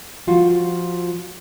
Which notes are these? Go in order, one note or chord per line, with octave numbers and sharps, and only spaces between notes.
F3 F4 F#4